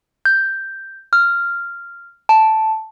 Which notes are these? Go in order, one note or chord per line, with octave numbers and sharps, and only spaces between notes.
G6
F6
A5